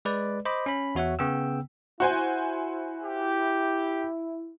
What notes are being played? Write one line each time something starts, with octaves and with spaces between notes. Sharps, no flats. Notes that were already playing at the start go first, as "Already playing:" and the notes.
G#3 B4 D5
C5 D#5 B5 D6
C#4 B5
E2 F#4 C#5 E5 F#5
C#3 B3 G5 E6
E4 F#4 C5 G#5
G4